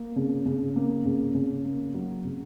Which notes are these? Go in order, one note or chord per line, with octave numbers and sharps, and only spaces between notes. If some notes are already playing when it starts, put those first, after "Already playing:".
Already playing: A#3
C#3
C#3
A#3
C#3
C#3
A#3
F#3
C#3